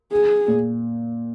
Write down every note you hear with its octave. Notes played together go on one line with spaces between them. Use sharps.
G#4
A#2